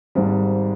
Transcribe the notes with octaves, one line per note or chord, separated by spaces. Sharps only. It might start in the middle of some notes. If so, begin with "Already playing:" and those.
G#1 G#2 G3